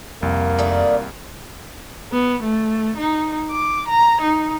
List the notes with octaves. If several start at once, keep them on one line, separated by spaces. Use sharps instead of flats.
C2 F2 A#3
D#3 A3 D5
B3
A3
D#4
D6
A#5
D#4